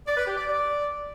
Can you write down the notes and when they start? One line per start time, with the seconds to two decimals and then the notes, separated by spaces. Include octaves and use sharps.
0.07 D5
0.17 B4
0.27 G4
0.37 D5
0.47 D5